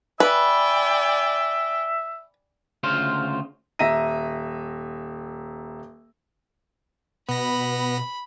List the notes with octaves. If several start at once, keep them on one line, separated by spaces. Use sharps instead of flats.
B4 D5 E5 G5 G#5
D2 C#3 F4 C5 F5
D#1 E5 A#5 A#6 D#7
B2 B3 B5 A#6